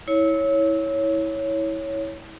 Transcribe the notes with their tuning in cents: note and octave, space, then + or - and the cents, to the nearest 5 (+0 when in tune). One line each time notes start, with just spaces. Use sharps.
E4 -25 C#5 +0